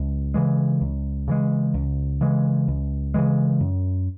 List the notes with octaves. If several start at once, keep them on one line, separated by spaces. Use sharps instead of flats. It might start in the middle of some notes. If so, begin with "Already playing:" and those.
Already playing: C#2
C#3 E3 G#3
C#2
C#3 E3 G#3
C#2
C#3 E3 G#3
C#2
C#3 E3 G#3
F#2